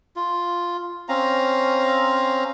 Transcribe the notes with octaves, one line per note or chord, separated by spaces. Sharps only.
F4
C4 C#4 F5 A#5